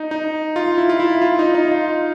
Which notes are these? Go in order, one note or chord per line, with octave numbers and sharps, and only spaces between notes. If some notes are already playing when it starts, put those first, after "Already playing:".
Already playing: D#4
D#4
F4
E4
F4
E4
F4
D#4
D#4
F4